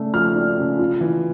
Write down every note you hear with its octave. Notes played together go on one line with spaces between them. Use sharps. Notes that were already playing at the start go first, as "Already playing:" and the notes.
Already playing: C#3 A3 D4
F3 F6
D4
C#3
F4
E3